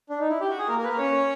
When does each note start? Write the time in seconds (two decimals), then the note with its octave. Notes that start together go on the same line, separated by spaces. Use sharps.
0.10 D4
0.20 D#4
0.29 E4
0.41 G4
0.49 F#4
0.58 G#4
0.68 A#3 A#4
0.78 A#3 A#4
0.84 B4
0.89 A#3 A#4
0.98 C#4 C#5